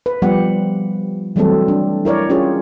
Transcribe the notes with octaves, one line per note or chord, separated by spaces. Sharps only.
B4
F3 G3 B3 G4 F#5
E3 F#3 G3 A3 C4 A4
D4
E4 A#4 C#5 D5
C#4 F4 G4 G#4 C#5